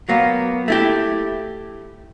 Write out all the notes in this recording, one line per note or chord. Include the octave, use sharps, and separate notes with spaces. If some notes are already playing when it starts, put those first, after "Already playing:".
F#3 A#3 B3
A3 E4 G4